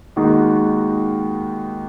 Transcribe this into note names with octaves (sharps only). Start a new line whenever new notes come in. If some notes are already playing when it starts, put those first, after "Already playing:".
D#2 D#3 G#3 D#4 F#4